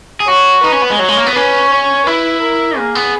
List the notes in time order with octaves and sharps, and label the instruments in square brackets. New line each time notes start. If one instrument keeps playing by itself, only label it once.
[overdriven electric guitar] G#4
[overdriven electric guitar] F#4 [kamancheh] C#5
[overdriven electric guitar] D#4 [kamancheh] B4
[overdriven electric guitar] C#4
B3
G#3
[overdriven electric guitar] F#3 [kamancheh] C#5
[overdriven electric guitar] G#3
A#3
B3
[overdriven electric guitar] C#4 [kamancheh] B4
[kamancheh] C#5
[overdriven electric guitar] E4 [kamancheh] B4
[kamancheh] A#4
[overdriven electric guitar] A#3 [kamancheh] G#4
[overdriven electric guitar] B3